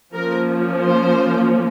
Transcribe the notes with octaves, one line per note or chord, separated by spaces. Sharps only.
F3 A#3 C#4 A#4
C5